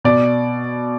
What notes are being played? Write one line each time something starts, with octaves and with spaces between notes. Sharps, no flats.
B2 D5